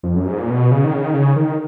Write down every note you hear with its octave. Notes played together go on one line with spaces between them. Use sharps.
F2
F#2
G#2
A#2
B2
C#3
D#3
C#3
D#3
C#3
D#3